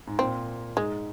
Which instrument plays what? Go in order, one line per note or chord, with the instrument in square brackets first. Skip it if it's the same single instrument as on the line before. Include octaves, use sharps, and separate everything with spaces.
[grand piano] G#2
[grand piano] A#2 [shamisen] C4
[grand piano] G#2 [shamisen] G#3